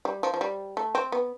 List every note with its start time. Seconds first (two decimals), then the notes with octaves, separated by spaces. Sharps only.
0.05 G3
0.23 F3
0.34 F3
0.41 G3
0.77 A3
0.95 C4
1.12 B3